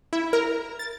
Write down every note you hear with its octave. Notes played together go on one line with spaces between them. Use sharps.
E4
A#4
A6